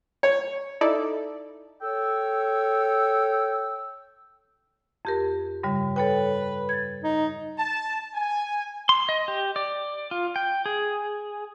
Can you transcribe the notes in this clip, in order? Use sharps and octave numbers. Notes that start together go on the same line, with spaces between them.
C#5
D#4 E4 A4 D5
A4 C#5 G5 E6
F2 G4 A#4
G2 C#3 G3
A4 B4 C#5 G5
G#6 A6
D#4
A5
G#5
C6
D#5
G4
D5
F4
G5
G#4